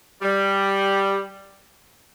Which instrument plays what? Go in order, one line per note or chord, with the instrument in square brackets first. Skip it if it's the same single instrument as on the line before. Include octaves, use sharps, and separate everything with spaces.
[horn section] G3